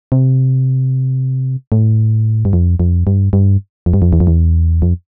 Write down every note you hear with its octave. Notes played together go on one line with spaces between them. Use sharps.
C3
A2
G2
F2
F2
G2
G2
F2
G2
F2
E2
F2
E2
F2